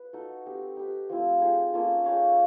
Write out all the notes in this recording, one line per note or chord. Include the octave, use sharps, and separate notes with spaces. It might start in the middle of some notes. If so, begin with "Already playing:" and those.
Already playing: B4
D#4 F#4 A4
C4 D#4 G4
D#4 G4 B4
F3 A3 C4 E4
D#4 G#4 C5
A#3 C#4 F4 A4
D#4 G#4 C#5 F5